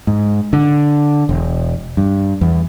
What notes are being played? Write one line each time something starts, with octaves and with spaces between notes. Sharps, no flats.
G#2
D3
E1
G2
E2